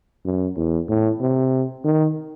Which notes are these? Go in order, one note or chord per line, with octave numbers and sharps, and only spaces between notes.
F#2
E2
A2
C3
D#3